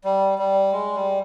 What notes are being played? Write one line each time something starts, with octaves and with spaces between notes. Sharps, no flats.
G3
G3
G#3
G3